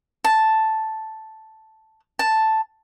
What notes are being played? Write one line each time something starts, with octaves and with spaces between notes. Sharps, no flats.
A5
A5